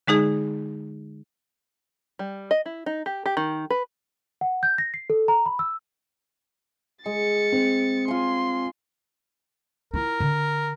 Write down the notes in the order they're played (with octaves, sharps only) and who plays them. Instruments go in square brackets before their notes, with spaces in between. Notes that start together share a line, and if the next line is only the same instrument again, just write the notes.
[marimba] D3 G#3 D#4 G#4
[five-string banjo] G3
D#5
E4
D#4
G4
G4
D#3
B4
[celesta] F#5
G6
A#6
C7
A4
A#5
B5
E6
[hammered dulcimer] G#3 [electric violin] A6 C#7
[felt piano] C4
[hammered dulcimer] F4 G#5 [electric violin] C6
[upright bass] E4 F4 [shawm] A#4
[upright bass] D3